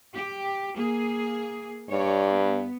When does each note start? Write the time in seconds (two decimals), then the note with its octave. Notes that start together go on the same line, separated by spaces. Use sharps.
0.14 G4
0.74 A#3 G#4
1.90 G2 C#5 D5
2.33 B3